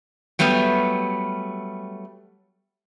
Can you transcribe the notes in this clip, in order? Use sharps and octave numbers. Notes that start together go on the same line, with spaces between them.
F#3 G3 A3 B3